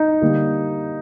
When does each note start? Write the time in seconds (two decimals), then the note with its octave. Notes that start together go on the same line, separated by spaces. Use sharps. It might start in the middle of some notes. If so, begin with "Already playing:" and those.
Already playing: D#4
0.22 D3 G3 A#3